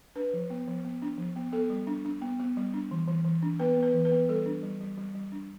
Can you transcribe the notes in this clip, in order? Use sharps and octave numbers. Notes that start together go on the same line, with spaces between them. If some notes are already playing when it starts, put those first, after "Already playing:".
D4 B4
F3
B3
F3
B3
D4
F3
B3
B3 A4
G3
D4
D4
B3
B3
G3
D4
E3
E3
E3
D4
B3 B4
B3
B4
E3
B4
B3
G3 A4
D4
G3
G3
G3
G3
D4